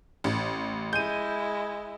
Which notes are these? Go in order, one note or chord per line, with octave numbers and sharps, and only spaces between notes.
A1
G#3 E4 G6 D#7